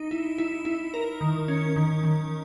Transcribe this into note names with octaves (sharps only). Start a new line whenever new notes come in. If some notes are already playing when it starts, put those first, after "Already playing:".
Already playing: D#4
E4
E4
E4
A#4
D#3
C#4
D#3
D#3